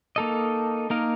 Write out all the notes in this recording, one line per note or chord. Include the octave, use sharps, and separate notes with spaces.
A#3 D#4 A4 D#5
A#3 D#4 A#4 F5